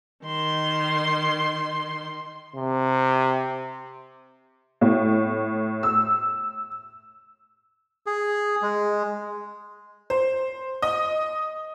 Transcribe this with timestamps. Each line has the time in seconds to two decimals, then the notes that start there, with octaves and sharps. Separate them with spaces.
0.24 D#3 C6
2.56 C3
4.81 A2
5.83 E6
8.06 G#4
8.62 G#3
10.10 C5
10.82 D#5